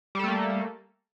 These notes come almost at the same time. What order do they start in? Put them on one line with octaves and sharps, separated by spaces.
G3 A4 A3 A#3